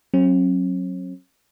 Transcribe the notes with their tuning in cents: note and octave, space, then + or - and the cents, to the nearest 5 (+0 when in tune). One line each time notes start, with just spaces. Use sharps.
F#3 +0 C#4 -45